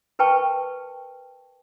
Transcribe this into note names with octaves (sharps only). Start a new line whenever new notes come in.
A#4 B4 G5 A5 C#6